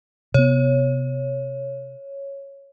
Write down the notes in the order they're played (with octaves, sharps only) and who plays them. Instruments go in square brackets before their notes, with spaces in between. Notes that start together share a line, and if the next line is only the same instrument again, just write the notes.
[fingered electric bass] C3 B3 [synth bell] C#5